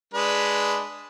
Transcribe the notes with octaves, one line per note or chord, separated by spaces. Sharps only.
G#3 D4 B4